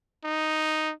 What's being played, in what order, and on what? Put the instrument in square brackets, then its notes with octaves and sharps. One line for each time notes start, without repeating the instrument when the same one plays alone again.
[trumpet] D#4